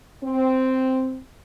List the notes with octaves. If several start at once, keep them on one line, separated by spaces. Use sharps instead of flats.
C4